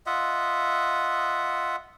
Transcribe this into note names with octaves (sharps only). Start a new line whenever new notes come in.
F4 D#5 E5 F#5